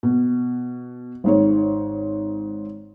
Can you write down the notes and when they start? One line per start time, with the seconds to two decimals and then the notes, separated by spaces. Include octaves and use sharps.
0.03 B2
1.24 G#1 G#2 C#5